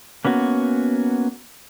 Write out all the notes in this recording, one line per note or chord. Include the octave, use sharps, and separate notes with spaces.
A#3 B3 C#4 F#4